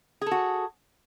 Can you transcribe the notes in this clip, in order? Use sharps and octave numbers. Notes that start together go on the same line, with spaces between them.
F#4 G#4 A4